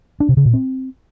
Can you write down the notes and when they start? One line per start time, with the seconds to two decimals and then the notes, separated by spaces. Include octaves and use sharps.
0.20 D4
0.29 C3
0.37 C#3
0.45 A#2
0.53 C4